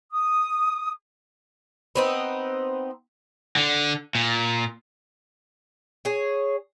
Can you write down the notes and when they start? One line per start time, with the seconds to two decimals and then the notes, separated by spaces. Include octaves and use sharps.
0.12 D#6
1.95 B3 C4 D#4
3.56 D3
4.15 A#2
6.05 G#4 C#5